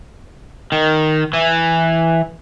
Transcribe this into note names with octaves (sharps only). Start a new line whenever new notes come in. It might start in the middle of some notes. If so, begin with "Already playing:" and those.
D#3
E3